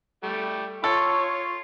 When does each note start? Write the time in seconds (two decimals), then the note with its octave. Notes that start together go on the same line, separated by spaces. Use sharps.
0.23 G3 A3
0.84 F4 A4 C#5